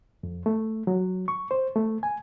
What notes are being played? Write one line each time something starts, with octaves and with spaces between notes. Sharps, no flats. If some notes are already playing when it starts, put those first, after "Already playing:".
F2
A3
F#3
C#6
C5
A3
G#5